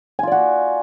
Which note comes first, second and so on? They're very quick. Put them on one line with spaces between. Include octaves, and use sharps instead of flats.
G#5 F4 D5 F#4